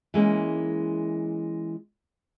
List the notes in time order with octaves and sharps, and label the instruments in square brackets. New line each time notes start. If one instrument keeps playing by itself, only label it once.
[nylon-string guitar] E3 G#3 A#3 C#4